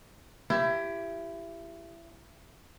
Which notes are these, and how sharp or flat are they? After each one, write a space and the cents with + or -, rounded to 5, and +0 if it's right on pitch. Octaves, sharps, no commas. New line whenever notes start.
E4 +25 G4 +0